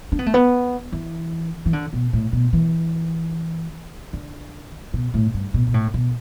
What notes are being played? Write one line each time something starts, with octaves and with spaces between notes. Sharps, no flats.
D4
B3
A3
B3
E3
E3
D3
B2
A2
B2
E3
D3
B2
A2
G2
B2
B2
A2
B2